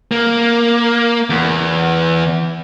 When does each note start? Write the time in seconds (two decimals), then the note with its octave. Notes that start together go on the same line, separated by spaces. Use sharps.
0.11 A#3
1.30 E2